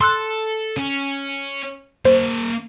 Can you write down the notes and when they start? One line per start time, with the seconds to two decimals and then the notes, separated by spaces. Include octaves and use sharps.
0.01 A4 C6 E6 F#6
0.77 C#4
2.05 A#3 C5 E5